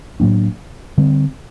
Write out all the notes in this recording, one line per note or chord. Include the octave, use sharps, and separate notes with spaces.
A2 F#3 A#3 D4
D3 G3 C4